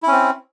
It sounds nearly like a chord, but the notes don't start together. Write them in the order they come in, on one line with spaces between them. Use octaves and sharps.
E4 C#4 C4